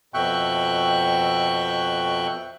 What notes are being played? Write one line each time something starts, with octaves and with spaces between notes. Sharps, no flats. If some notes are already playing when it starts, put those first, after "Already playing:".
F2 B2 E5 G5 C#6 F#6